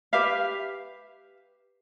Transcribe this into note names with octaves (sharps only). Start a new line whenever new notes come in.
G4 B4 E5 F5